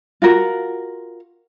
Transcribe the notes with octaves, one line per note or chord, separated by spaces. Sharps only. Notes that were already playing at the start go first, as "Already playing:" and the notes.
F4 F#4 A#4